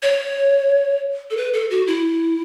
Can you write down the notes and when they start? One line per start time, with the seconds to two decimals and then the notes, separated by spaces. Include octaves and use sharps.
0.03 C#5
1.31 A4
1.37 B4
1.54 A4
1.71 F#4
1.87 E4